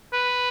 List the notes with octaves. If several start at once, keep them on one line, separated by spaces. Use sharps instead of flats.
B4